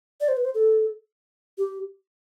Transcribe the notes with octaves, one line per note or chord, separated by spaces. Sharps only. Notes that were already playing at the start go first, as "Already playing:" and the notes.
D5
C5
B4
C5
A4
G4